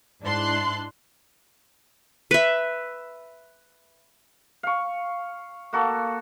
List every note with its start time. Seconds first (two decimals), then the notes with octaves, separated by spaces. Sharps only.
0.22 G#2 D4 E4 A5 C6 F#6
2.31 B4 E5
4.63 F5 C#6
5.73 A#3 F#4 A4